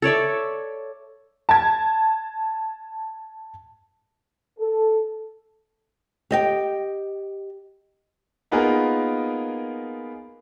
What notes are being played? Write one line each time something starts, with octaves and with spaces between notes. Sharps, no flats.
A4 C#5 D5 E5
A5 G#6
A4
G4 D#5 G5
A#3 B3 D#4 F4 G#4 A#4